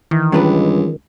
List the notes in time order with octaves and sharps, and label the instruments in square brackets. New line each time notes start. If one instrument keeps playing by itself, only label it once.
[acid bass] D#3 [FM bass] E3
[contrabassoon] C#2 [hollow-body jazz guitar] G2 D4 B4